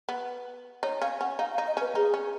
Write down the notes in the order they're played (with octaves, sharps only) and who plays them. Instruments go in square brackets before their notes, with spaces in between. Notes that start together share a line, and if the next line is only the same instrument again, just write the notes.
[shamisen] B3
[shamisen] D#4 [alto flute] C#5
[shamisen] C#4 [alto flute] F5
[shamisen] C#4 [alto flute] F#5
[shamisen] D#4 [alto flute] F5
[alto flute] F5
[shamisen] D#4
[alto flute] D#5
[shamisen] C#4 [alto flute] B4
[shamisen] D#4 [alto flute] G#4
[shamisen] C#4